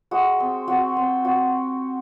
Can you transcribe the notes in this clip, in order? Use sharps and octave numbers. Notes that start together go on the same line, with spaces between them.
G#3 F#4
C4
C4 F#4
C4
C4 F#4